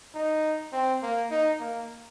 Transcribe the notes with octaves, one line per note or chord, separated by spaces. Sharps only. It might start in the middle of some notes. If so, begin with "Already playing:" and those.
D#4
C4
A#3
D#4
A#3